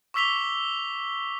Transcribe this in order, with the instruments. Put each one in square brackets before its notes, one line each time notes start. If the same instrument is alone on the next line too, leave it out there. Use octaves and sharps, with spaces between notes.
[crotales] C#6 D6 E6 B6 F7 G7